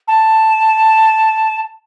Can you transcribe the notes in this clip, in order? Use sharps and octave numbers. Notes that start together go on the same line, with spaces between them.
A5